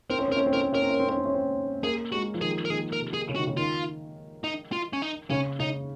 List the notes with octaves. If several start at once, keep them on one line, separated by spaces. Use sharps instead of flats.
C4 A#4
C#4
C4 A#4
C#4
C4
C#4 A#4
C4
C#4 A#4
C4
C#4
C4
C#4
C4
C#4
C4
A#3 G#4
G#3 F#4
F3
D#3 G#4
A#4
D#3 G#4
A#4
C3
G#4
C#3
D#3 F#4
C#3
D#3 F4
D#4
F4
C#4
D#4
C#3 C#4
C#3 D#4